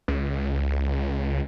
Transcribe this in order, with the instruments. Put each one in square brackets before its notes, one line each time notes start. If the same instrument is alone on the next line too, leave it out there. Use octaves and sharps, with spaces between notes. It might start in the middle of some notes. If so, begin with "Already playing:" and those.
[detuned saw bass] C#2